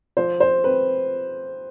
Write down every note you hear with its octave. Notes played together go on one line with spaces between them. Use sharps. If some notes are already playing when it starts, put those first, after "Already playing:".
F3 C5
C5
C4 B4